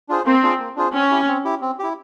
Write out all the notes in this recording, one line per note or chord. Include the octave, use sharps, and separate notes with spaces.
D4 F4 G#4 C5
A#3 C4
D4 F4 G#4 C5
A#3
D4 F4 G#4 C5
C4 C#4
E4 G4
C4
E4 G4
C4
E4 G4